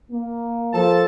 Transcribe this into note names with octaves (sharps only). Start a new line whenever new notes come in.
A#3
F3 A4 A5